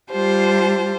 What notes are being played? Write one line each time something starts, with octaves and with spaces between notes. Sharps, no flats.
G3 F4 G4 C5 A5